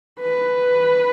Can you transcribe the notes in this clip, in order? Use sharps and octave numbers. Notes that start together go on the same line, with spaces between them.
B4